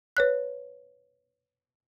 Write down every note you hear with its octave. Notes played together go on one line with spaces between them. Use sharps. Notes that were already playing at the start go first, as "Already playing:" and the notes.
B4 C#5 F#6